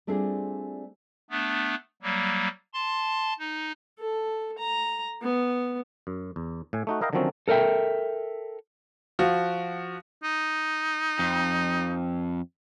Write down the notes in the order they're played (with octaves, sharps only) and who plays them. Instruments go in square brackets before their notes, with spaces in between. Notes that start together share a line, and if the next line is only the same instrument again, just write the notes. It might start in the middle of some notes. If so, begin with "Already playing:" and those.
[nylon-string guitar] G3 A3 C4 D4 F4 G#4
[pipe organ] A3 B3 D4
F#3 G3 A#3
A5 C6
D#4
[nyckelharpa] A4
A#5
B3
[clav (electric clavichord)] F#2
E2
A2 G#5
A3 D#4 F#4
E4 A#4 D#5 F5 G5 A#5
D3 D#3 F3 F#3 C4 C#4
[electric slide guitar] A4 A#4 D5 E5 G5
[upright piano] F3 F#4
[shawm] D#4
[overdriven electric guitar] F2